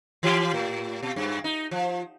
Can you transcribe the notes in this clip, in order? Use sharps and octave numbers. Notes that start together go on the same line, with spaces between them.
E3 F4 G4
A2
B2
G2
D#4
F3